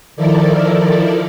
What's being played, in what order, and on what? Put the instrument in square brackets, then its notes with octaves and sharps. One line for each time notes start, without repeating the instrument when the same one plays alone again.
[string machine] D#3 F3 E4 A4 A#4 D5